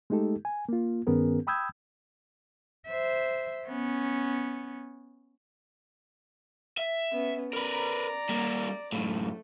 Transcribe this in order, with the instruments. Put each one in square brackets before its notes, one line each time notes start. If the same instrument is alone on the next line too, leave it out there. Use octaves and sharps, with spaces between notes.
[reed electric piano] G#3 A3 D#4 G4 A4
G#5
A#3 F4
G2 D#3 B3 C#4 G#4 A#4
G5 B5 D#6 E6 G6 G#6
[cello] C5 E5
B3 C#4
[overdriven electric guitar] E5
[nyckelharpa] B3 C#4
[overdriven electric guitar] A#4 B4 [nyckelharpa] D5 A#5
[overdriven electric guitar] G3 A#3
[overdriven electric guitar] F#2 A2 [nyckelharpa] A3